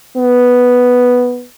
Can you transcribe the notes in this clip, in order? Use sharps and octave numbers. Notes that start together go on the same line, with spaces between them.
B3